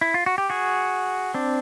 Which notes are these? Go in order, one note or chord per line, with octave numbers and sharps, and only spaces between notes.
E4
F4
F#4
G4
F#4 G#4
C4 D4